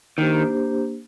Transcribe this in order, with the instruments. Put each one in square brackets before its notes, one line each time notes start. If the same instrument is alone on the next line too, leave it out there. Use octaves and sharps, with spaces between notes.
[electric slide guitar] D#3 [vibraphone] A#3 D4 G4 C5